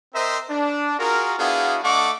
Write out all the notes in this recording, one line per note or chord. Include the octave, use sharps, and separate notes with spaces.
C4 A#4 C5 D#5 E5
D4
F4 F#4 G#4 A#4
B3 D4 E4 F#4 G#4 F5
A3 D4 D#5 F#5 C#6 D6